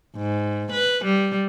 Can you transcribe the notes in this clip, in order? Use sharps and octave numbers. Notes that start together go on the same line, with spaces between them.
G#2
B4
G3